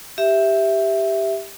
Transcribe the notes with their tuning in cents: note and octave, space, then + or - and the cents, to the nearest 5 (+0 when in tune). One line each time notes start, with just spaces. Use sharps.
G4 +5 E5 +0